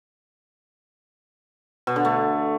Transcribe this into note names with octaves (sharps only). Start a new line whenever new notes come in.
B2
D3
A3